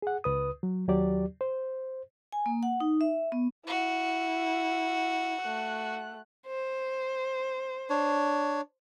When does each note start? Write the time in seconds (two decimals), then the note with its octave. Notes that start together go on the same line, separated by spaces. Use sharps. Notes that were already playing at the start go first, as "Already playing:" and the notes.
0.02 G#4 F#5
0.24 C#2 B4 D#6
0.63 F#3
0.88 D#2 F#3 G4 D5
1.41 C5
2.32 G#5
2.46 A#3
2.63 F#5
2.80 D#4
3.01 E5
3.32 B3
3.67 E4 F#4
5.41 A3 F#6
6.46 C5
7.90 D4 C#5